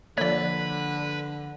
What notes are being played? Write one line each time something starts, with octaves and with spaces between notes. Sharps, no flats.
D3 F3 A#3 B4 C#5 D5